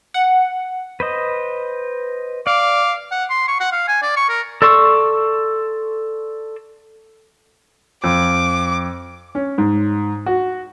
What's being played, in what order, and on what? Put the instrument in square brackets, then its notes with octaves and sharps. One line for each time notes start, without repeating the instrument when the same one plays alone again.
[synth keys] F#5
[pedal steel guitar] B4 C5 D#5
[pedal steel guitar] D5 [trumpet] F5 [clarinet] D6
[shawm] F#5
C6
C#6
F#5
F5
G#5
D5
C#6
A#4
[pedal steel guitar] A4 D5 C6 C#6 E6
[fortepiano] F2 [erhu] D6
[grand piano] C#4
G#2
F#4